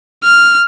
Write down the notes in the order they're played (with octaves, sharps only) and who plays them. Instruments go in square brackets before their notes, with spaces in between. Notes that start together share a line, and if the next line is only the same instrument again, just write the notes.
[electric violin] F6